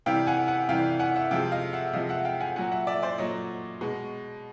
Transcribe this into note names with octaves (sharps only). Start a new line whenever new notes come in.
C3 E3 G3 F5 G5
F#5 G#5
F#5 G#5
C3 E3 G3 F5 G5
F#5 G#5
E5 F#5
C3 F3 G#3 F5 G5
D#5 F5
E5 F#5
C3 F3 G#3 D#5 F5
E5 F#5
F5 G5
F#5 G#5
A#2 F#3 F#5 G#5
E5 F#5
D5 E5
C5 D5
A#2 F#3 C#5 D#5
B2 G#3